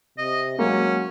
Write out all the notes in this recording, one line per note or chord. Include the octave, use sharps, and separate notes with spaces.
C3 D#5
F#3 G#3 A#3 C#4